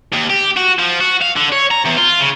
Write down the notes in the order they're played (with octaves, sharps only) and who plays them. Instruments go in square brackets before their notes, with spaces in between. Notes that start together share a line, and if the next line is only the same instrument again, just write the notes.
[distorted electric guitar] D#2
G4
F#4
F3
F#4
F5
D3
C#5
A#5
E2
F4
C#3